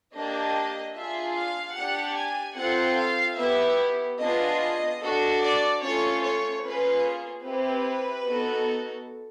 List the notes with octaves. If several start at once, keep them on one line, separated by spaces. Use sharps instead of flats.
A#3 D4 G4 D#5
D4 F4 G#4 E5
F5
D4 G4 F#5
G#5
C4 F4 A4 F#5
F5
B3 E4 G4 E5
B3 D4 F4 G#4 D#5
D4 F#4 A4
D5
A3 C#4 F4 A4 C#5
C#5
A#3 C#4 F4 G#4 B4
C4 E4 G4 B4
B3 D#4 F#4 A4